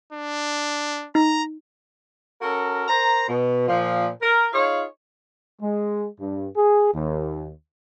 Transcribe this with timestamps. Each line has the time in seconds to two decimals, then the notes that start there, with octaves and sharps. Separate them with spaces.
0.13 D4
1.15 D#4 A#5
2.42 C#4 F#4 A4 A#4
2.88 A#4 C5 A#5
3.29 B2
3.68 A#2 F3
4.22 A#4
4.53 D#4 F4 G#4 C#5 F5
5.62 G#3
6.21 G2
6.56 G#4
6.94 D#2